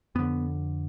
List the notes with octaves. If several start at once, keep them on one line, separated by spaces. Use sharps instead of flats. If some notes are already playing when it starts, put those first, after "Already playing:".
F2 D3 B3